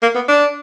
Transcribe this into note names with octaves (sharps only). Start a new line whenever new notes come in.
A#3
B3
D4